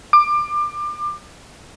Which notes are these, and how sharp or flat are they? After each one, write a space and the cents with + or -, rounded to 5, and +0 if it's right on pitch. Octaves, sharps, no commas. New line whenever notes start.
D6 +25